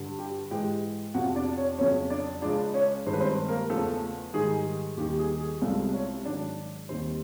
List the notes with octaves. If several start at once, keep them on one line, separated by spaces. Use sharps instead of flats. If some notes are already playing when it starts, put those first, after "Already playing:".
Already playing: G2 D3 G3
G4 G5
G#2 E3 G#3 G4 G5
F2 C3 F3 F#4 F#5
D4 D5
C#4 C#5
F2 C#3 F#3 C#4 C#5
D4 D5
C#2 C#3 F3 G#3 D4 D5
C#4 C#5
G2 D#3 G#3 C5
B4
C4 C5
A#3 A#4
E2 C#3 F3 A3 A4
G#2 D#3 G3 G#4
D#2 D#3 G3 G4
G#4
G#4
C2 C3 F3 G#3 A3 A4
C#4 C#5
G#2 D#3 F#3 D4 D5
D#2 D#3 G3 C4 C5